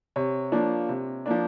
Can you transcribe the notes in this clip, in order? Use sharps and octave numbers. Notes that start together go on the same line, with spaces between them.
C3 C#5
F3 A#3 D4
C3
F3 A#3 D4